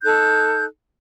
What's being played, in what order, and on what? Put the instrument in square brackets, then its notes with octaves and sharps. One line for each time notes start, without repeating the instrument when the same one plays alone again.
[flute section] D#4 A4 F#6 G6